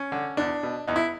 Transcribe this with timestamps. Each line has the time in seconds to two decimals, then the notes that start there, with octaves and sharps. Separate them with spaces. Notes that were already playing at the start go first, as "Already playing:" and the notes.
Already playing: C#4
0.12 D3
0.37 E2 D4
0.63 B2
0.87 E2 D#4
0.96 E4